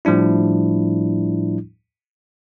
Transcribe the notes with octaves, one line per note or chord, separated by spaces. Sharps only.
A2 F3 G3 D4 E4